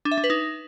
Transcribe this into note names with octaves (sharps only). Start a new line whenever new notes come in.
D4
E5
D4
B4
D#4